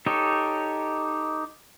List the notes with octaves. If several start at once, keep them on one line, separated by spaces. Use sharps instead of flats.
D#4 G4 A4 C#5